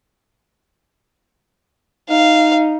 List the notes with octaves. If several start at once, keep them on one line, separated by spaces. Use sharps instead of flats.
D#4 F5